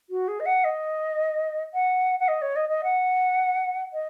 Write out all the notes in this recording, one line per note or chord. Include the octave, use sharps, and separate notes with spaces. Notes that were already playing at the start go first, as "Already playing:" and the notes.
F#4
G#4
D#5
F#5
D#5
F#5
F#5
D#5
C#5
D#5
D#5
F#5
D#5